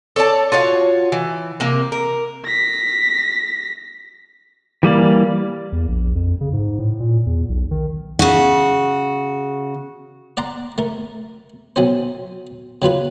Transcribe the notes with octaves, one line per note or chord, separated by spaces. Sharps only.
A4 C#5 D5 A5
F4 F#4 C#5 F5
E3
C3 A#3
A#4
A#6 B6
E3 G3 A#3 D5
E2
A#1
F2
C#3
G#2
A2
A#2
E2
B1
D#3
C#3 F#4
D5 F#5 A#5 C6
A3 A#4
B1 F#3 C#4 C5
C#3 F#3 F4 B4